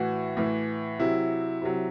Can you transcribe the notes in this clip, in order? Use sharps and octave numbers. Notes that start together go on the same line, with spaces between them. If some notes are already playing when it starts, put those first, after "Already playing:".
Already playing: A2 E3 F#4
A2 E3
C3 F#3 E4
C3 F#3